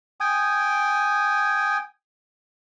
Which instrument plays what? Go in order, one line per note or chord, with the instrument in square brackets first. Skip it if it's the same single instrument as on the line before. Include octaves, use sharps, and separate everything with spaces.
[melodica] G5 G#5 D#6